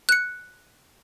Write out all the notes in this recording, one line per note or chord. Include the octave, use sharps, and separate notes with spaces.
F#6 C#7